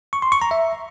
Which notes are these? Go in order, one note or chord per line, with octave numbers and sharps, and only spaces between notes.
C#6
C6
C#6
A#5
E5